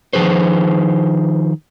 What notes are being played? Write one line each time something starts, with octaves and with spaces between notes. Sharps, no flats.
D#3 F3 G#4 B4 C5